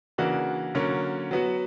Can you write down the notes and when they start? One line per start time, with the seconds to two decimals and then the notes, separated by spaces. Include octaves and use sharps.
0.18 C#3 E3 A#3 D4 F#4
0.75 D3 F#3 A#3 C#4
1.31 F#3 B3 F#4